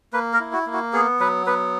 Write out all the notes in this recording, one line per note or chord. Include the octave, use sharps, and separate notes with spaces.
A#3 B4
A#4
E4
F#4
A#3
F#4
B3 G#4
F#3 B4
B3 B4